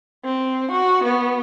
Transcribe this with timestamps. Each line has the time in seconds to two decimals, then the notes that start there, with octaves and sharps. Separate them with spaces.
0.25 C4
0.71 F#4
1.04 B3